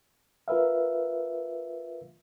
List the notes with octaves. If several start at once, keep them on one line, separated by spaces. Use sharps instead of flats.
F4 A#4 B4 E5 F5